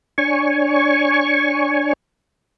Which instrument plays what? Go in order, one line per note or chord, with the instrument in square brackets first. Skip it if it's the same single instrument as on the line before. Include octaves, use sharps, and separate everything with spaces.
[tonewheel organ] D4 C#5 G#5 C#6